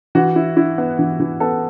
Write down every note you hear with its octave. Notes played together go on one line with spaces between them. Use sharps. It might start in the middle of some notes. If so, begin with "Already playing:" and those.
E3 F#4
E4
E4
B3
E3
E3
B3 A4